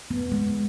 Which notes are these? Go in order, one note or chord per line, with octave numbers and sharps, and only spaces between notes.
B3
G#3